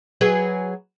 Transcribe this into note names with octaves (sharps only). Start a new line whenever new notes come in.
F#3 G#4 B4